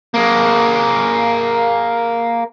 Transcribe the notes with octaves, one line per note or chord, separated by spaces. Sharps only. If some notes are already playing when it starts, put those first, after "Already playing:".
A#3 G#4